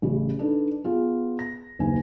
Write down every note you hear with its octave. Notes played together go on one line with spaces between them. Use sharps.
A1 C#3 G3
D4 D#4 A4 B4
B3 F4 G#4
A#6
F#1 D#2 D#4 B4 G#5